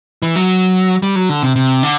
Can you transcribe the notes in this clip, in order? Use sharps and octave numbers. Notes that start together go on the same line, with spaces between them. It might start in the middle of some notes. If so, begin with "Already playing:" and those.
E3
F#3
G3
F#3
D3
C3
C3
D3